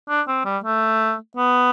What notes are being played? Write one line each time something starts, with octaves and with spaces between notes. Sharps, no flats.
D4
C4
G3
A3
B3